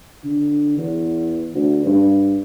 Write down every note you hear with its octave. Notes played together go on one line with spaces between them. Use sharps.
D3
E2
D2
G2